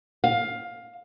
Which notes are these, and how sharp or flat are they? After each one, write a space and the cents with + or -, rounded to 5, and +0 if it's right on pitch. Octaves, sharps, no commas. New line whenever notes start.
F5 +15